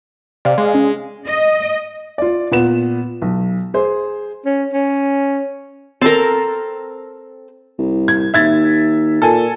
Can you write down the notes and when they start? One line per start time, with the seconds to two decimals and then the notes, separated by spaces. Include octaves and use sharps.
0.45 C3 D5 F5
0.58 G#3
0.75 C#4
1.28 D#5
2.18 F4 D5
2.51 A#2 B3 E7
3.22 B1
3.74 G#4 C5
4.45 C#4
4.73 C#4
6.01 C4 A4 A#4 A5
7.78 C2
8.08 G#6
8.34 D#2 E5 G#6 A6
9.22 A#2 A4 G#5